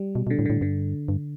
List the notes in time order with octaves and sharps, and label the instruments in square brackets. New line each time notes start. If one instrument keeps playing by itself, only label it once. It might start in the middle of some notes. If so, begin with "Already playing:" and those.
Already playing: [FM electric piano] G3
[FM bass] B2
B2
[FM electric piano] D3
[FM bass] A2
[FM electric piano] D3
[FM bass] A2
[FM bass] G2 [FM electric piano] D3
[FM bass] G2